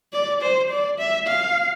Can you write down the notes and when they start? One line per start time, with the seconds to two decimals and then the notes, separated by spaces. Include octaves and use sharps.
0.13 D5
0.42 C5
0.70 D5
0.99 E5
1.27 F5